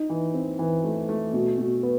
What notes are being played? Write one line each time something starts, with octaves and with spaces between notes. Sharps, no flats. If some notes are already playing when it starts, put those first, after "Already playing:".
Already playing: D#4
E3
C4
E3
A3
A3
B2
B2
B3